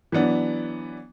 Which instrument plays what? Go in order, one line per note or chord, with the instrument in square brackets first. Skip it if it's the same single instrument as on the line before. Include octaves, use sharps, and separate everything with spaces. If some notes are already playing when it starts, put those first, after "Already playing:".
[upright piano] E3 F#3 B3 D4